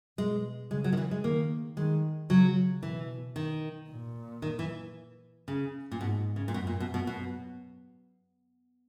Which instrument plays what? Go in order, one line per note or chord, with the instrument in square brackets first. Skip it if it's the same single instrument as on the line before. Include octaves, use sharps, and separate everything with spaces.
[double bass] B2 [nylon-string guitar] G#3
[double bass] C#3 [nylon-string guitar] G#3
[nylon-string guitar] F#3
D#3
E3
G#3
[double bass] D#3 [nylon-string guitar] A#3
[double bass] D#3 [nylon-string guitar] G#3
[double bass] C#3 [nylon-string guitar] F#3
[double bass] B2 [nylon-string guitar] E3
[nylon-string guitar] D#3
[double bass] A#2
[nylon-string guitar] D#3
E3
C#3
A#2
[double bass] G#2 [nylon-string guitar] B2
[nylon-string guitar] C#3
A#2
[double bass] F#2 [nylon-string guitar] B2
[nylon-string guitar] A#2
B2
B2
B2